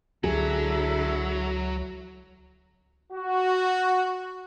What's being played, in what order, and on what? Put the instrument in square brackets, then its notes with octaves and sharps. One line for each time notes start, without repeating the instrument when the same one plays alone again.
[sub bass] C#2 [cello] D3 E4 [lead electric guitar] F#3 [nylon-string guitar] G#4
[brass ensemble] F#4